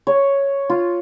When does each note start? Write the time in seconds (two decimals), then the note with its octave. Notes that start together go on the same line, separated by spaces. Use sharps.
0.07 C#5
0.70 F4